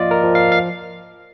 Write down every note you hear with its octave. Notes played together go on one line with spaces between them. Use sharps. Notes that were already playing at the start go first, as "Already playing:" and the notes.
Already playing: F3 A#3 F4 D5 D#5 F5
A#4
F3
F5
F5